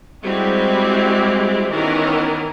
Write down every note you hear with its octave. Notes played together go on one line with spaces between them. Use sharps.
G3 G#3 C4 E4 F#4 G4
D#3 E3 B3 C#4 A#4